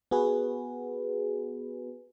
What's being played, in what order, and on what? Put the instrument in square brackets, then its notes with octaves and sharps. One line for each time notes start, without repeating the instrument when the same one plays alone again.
[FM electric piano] B3 F#4 G#4 B4